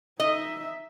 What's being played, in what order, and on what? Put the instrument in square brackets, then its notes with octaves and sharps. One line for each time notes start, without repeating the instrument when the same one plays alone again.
[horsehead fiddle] D#4 E5 [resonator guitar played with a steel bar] D#5